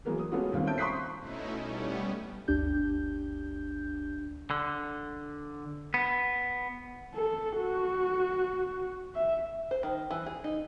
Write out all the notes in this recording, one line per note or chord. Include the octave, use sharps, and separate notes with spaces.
E3 F#3 G#3 A#3 B3 G#4
D#6
G#3 A3 B3 C#4 F4 F#4
D#2 G3 C4 F5
C#4 C5 E5 A5 G6 D7
C6 C#6 D#6 F#6 B6 C7
B2 A3 C#4 D#4 E4
G3 A3 B3 C#4
G1 D2 D4 G4 G6
D3
B3
A4
F#4
E5
C5
D#3
E3
G#4
D#4